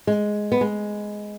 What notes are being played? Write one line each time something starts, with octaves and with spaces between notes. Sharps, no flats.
G#3
B3
G#3